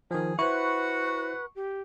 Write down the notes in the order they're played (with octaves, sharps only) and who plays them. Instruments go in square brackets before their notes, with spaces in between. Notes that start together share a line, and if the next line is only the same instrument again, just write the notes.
[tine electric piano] D#3 F3 [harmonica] G#4
[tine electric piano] E4 C5 [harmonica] F#4 F#5 [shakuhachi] B4 [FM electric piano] C#6
[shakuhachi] G4